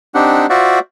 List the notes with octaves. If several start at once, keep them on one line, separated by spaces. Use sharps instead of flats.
C4 D4 D#4 G4 F#5
F4 F#4 C5 D5 E5 F#5